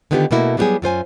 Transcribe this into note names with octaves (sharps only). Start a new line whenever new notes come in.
D3 D#3 B3 E4 F4 G4
B2 A3 A#3 E4 F#4
F#3 G3 B3 F4 G4 G#4
F#2 F4 C5 G#5